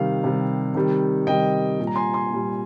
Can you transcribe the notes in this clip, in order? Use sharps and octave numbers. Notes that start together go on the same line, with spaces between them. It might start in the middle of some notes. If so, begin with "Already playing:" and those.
Already playing: C3 D#3 G3 F5
C3 D#3 G3
C3 D#3 G3
C3 D#3 G3 D#5 G5
A#2 G3
A#5
G#5 C6
G#5 C6
A#2 G3